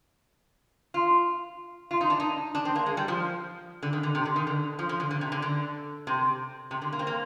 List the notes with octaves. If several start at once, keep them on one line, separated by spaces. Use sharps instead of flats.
F4
F4
D#4
D4
D#4
D4
C4
A#3
G#3
G3
F3
D3
D#3
D3
C3
D3
D#3
D3
F3
F3
D3
D3
C3
D3
D3
C3
C3
D3
A#3
C4
A#3